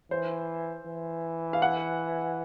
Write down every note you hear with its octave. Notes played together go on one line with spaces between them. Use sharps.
E3 C5
E3
F5
F#5